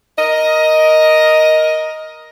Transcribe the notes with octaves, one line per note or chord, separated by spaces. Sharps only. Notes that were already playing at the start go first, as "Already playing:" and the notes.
A#4 D#5